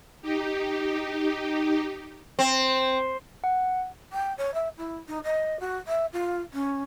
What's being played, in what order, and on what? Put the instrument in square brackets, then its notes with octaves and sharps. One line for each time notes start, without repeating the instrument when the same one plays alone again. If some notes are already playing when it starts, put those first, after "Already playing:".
[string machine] D#4 G4
[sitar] C4
[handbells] F#5
[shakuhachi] G5
C#5
E5
E4
D#4
D#5
F#4
E5
F4
C#4